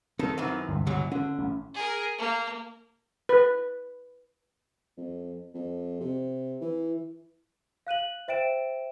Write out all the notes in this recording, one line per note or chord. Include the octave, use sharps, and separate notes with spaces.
D#3 C4 D#4 A4
F#2 D#3 E3
G1 C#2 C3
B2 E3 F#3
D3 C#4
A1 C#4
G#4 A#4
A#3
B4
F2
F2
C3
E3
F5 F#6 D#7 F#7
C5 E5 G5 D7 E7